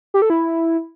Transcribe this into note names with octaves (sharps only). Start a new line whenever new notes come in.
G4
A4
E4